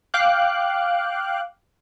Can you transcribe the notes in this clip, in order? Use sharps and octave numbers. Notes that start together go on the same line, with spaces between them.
F5 G5 D6 F#6